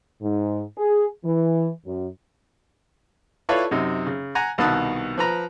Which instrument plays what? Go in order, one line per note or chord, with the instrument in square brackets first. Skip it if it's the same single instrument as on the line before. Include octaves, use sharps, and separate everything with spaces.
[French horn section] G#2
G#4
E3
F#2
[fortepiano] E4 F4 A4 B4 C#5 D5
F#2 C3 D#4
C#3
F#5 G#5 A#5
C2 B2 D#3 A5 D#6 F#6
F3 B4 A#5